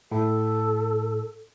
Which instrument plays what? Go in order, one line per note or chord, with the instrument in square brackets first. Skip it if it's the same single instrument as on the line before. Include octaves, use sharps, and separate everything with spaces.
[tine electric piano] A2 [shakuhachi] A4